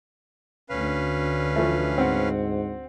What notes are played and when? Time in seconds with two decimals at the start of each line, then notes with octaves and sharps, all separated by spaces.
0.69 D2 C#4 B4 F5
1.56 E3 F3 A3
1.98 G#2 C4 F#5